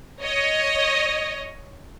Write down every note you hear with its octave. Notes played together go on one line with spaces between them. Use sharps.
C#5 D#5